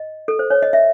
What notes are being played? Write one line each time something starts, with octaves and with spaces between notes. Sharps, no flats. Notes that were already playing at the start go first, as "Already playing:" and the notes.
Already playing: D#5
A4
C5
C#5
D#5
E5